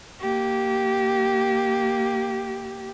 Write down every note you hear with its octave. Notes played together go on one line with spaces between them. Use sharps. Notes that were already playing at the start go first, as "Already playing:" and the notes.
A#3 G4